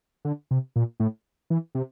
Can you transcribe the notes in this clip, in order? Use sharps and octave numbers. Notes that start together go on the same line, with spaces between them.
D3
C3
A#2
A2
E3
C3